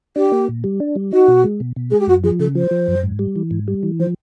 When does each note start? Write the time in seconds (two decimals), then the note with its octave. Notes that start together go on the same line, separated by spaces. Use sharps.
0.16 D4 G4
0.32 A#3
0.49 A#2
0.64 G3
0.80 D4
0.95 G3
1.12 D#4 F#4
1.28 B2
1.44 G#3
1.60 B2
1.76 B2
1.90 G#3 G#4
1.99 G4
2.07 F#2 F#4
2.24 F3 G#4
2.39 C#3 A4
2.55 F3 C5
2.71 F3
2.88 F#2
3.03 G#2
3.19 G3
3.36 E3
3.51 G#2
3.68 G3
3.83 E3
3.99 F3 C5